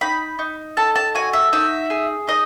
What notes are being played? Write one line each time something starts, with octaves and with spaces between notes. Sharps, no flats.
D#4 B5
D#4
A4 A5
A5
F#4 G#5
E5
D#4 E5
G#4
D#4 D#5